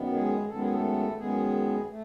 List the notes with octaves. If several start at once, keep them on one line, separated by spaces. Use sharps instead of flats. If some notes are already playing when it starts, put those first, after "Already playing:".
Already playing: F#2 D#3 B3
G#3 G#4
F#2 D#3 G#3 B3 A4
G#4
A3 A4
F#2 D#3 G#3 B3 G#4
A3